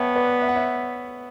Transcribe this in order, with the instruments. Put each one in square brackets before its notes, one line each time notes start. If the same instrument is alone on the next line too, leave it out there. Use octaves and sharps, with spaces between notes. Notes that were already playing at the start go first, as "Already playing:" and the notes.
Already playing: [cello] B3 [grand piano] C#5 E5 G5 A5
[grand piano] B4 D5
E5
F#5
C#5 E5